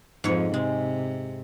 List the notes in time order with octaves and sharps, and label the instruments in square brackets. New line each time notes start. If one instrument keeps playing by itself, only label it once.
[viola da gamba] F2 [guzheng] G#2 C#5
[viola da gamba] C3 [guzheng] G#3